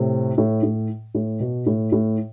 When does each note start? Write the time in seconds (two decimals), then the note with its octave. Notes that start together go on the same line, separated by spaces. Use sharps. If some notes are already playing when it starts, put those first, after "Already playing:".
Already playing: A2 C3
0.38 A2
0.63 A2
1.14 A2
1.40 B2
1.66 A2
1.92 A2